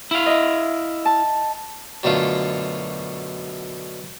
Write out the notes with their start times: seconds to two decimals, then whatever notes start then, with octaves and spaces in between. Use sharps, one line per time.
0.11 E4 F5
0.26 D#5 E5
1.05 A5
2.03 F#2 B2 D3 A3 F4